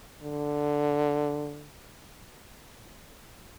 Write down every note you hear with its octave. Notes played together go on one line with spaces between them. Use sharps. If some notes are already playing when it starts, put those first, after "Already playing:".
D3